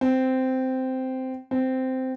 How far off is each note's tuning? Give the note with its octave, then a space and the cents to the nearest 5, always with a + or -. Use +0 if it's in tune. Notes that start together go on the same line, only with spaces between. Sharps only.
C4 -10
C4 -10